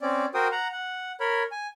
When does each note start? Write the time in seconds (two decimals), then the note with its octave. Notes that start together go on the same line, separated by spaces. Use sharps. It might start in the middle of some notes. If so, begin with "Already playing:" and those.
0.01 C4 C#4 D5
0.34 F#4 A#4 C5 G5 D#6
0.52 F#5 A#5
0.72 F#5
1.20 A#4 C#5 B5
1.51 G#5